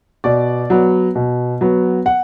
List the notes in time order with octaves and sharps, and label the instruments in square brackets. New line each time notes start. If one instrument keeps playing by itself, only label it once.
[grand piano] B2 D5
F#3 B3
B2
F#3 B3
F#5